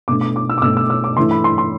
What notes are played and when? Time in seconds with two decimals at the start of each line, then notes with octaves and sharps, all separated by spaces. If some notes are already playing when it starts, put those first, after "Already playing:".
0.08 B2 A3 D4 D6
0.21 D6
0.36 D6
0.50 E6
0.58 D6
0.62 B2 A3 D4 E6
0.77 E6
0.90 E6
1.04 D6
1.16 E3 A3 D4 C6
1.31 B5
1.44 C6
1.58 C6